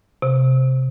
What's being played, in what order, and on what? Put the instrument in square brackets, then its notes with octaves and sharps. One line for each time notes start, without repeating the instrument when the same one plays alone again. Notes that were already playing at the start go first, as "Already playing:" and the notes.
[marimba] C3